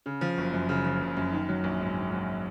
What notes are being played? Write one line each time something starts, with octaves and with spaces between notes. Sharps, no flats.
C#3
F3
F#1
F#2
C#3
F3
F#1
F#2
D#3
F#3
A#1
G#2
D#3
F#3